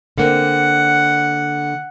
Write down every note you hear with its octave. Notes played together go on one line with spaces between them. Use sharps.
D3 A#3 C4 F#5